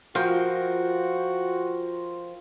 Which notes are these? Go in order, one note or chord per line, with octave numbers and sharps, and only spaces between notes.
F3 F4 F#4 A#4 G5